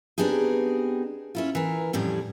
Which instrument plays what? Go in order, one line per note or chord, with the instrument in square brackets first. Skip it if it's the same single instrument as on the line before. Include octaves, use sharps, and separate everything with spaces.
[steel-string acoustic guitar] B3 C4 D4 D#4 G4 G#4
C#4 E4 F4
E3 A#4
F2 A2 D3 G3 C#4 D4